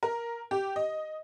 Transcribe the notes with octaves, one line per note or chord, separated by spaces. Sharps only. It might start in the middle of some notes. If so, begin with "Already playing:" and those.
A#4
G4
D#5